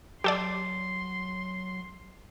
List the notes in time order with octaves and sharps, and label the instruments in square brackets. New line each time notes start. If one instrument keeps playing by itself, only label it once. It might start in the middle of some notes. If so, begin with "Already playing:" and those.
[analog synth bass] F#3 [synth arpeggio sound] G4 A4 D5 [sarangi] C6